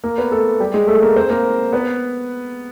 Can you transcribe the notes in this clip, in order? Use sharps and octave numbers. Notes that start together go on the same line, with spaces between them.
A#3 A#4
B3 B4
A3 A4
G3 G4
G#3 G#4
A3 A4
A#3 A#4
C4 C5
A#3 A#4
B3 B4